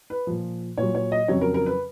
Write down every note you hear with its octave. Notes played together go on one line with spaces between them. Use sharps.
B4
A#2 F3
A#2 F#3 C#5
C#5
D#5
F2 C#3 F#3 C#5
A#4
A#4
B4